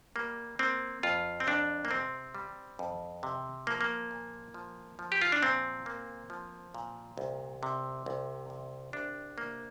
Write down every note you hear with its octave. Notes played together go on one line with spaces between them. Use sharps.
G3 A#3
A#3 C4
F2 F4
C4
F2 D4
A#3
C3 C4
G3
F2
C3
F3 A#3
A#3
A#2
F3
F3
G4
F4
D4
A#2 C4
A#3
F3
A#2
C2
C3
C2
C3
C2 D4
A#3